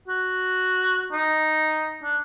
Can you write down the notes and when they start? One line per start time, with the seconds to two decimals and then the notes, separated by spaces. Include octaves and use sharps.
0.08 F#4
1.12 D#4
2.03 D4